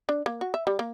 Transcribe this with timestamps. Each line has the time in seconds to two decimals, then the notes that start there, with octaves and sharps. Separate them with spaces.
0.09 D4
0.26 A#3
0.41 F#4
0.54 E5
0.67 G3
0.79 A#3